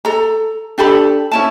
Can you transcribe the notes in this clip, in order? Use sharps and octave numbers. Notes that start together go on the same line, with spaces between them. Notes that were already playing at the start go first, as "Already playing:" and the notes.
A4 A#5
D4 G4 A4 B5
C#4 E4 A5